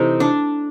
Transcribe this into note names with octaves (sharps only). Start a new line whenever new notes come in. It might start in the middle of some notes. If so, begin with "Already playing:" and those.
Already playing: C3 E3 A3 D#4
D4